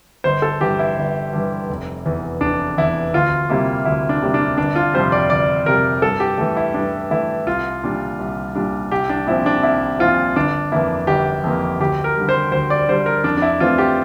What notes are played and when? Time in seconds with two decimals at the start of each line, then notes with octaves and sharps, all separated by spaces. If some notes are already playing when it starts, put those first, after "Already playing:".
0.24 G1 C5
0.42 A4
0.61 G2 E3 G4
0.79 E4
0.97 G1
1.33 G2 E3
1.69 F1
2.06 E2 E3
2.41 F1 D4
2.77 E2 E3 E4
3.13 D2 F4
3.49 C3 G3 A#3 E4
3.85 D2 E4
4.09 D4
4.22 C3 G3 A#3
4.34 D4
4.58 G1 D4
4.75 F4
4.94 F2 C3 G3 C5
5.12 D5
5.30 G1 D5
5.66 F2 C3 G3 A#4
6.02 G2 A4
6.20 G4
6.38 E3 A3
6.56 E4
6.74 G2 D4
7.10 E3 A3 E4
7.46 C2 F4
7.83 A#2 G3 D4
8.19 C2
8.55 A#2 G3 D4
8.91 C2 G4
9.09 D4
9.27 A#2 F3 C4 E4
9.46 D4
9.63 C2 E4
9.99 A#2 F3 C4 F4
10.36 G1 D4
10.72 F2 E3 A#3 E4
11.07 G1 G4
11.43 F2 E3 A#3
11.79 D2 G4
12.04 A#4
12.16 D3 G3
12.29 C5
12.52 D2 C5
12.70 D5
12.88 D3 G3 C5
13.06 A#4
13.24 F2 D4
13.37 D4
13.42 E4
13.60 E3 A3 C4 F4
13.78 G4